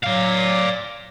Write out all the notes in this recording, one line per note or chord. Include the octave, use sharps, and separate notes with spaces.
F#3 D5 F5